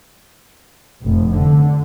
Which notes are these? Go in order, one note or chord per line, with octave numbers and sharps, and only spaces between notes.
F1
D3